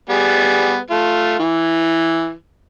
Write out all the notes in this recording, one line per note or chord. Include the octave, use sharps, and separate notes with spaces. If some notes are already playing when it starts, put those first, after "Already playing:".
G3 B3 G#4
A3 F4
E3